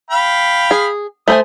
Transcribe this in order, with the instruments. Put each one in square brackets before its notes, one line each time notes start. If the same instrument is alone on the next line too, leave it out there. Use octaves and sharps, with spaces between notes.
[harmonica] F5 G5 B5
[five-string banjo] G#4
[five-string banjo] A3 C5 G#5 [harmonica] D#6